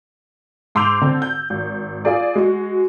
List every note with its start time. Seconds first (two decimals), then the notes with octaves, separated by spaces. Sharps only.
0.75 G#2 C6 D6 E6 G6 F7
1.02 D3 C4
1.22 G6
1.50 G#1
2.05 F4 G#4 D5
2.35 G#3 F#4